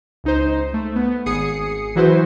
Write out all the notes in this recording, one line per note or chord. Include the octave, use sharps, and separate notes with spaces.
C#2 D#4 C5
A3
B3
G#1 G#4 D#6 C7 C#7
E3 F#3 E4 F#4 B4 C5